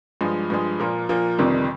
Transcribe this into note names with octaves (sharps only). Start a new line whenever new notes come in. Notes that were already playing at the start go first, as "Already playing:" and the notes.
G2 F3 G#3
G2 F3 G#3
A#2 F3 A#3
A#2 F3 A#3
G1 F2 C3 D#3 G3